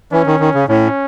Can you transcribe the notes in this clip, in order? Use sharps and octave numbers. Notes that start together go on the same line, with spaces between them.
E3 C#4
D#3
D#3
C#3
A2 C#4